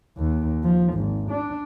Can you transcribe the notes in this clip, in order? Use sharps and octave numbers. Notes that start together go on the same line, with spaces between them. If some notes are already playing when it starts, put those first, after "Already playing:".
D#2
F3
G#1
D4